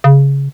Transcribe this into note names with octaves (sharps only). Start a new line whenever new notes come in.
C#3